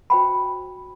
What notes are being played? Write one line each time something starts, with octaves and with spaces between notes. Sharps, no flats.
F#4 C5 G5 B5